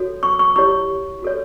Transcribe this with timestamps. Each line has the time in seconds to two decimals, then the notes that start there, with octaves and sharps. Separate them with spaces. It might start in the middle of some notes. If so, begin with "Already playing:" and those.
Already playing: F#4 A4 C#5
0.23 C#6
0.39 C#6
0.56 E4 G4 C#5 C#6
1.23 F#4 A4 C#5